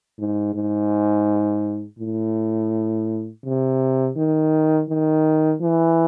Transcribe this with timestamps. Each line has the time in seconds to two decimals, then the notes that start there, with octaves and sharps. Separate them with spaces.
0.19 G#2
0.55 G#2
1.99 A2
3.44 C3
4.17 D#3
4.89 D#3
5.62 E3